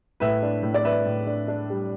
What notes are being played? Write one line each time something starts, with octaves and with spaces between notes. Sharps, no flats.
A2 B4 E5
D4
A2
D5
D4 B4 E5
A2
D4
D4
G3